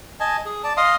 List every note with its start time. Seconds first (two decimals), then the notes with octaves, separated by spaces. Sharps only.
0.20 D#5 G#5 A5
0.45 G#4
0.64 D5 A5
0.77 D#5 F5 C6 D#6